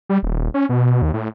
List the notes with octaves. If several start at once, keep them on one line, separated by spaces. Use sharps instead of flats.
G3
D#1
C#4
B2
D#2
A2